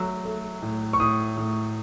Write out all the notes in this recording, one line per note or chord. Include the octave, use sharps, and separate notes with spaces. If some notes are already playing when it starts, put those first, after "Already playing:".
Already playing: F#3 A3 E6
A3
A2
C#6
A2 D#6
A2